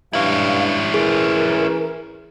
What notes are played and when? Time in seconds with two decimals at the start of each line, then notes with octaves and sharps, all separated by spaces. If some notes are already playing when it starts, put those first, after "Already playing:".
0.13 G2 C#4 E4 F5
0.94 E3 G#4 A#4